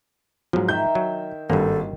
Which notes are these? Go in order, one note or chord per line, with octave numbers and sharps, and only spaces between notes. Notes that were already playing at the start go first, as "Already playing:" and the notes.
G#2 F3 F#3
D#3 E5 G6
F#3
G#1 G2 A#3 A4